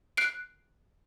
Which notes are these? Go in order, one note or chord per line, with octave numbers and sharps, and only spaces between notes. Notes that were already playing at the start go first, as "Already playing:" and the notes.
F#6 C7 D7